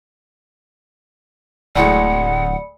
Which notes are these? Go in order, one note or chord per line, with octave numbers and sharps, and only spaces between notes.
D1 D2 A2 G#3 D5 F#5 B5 C#7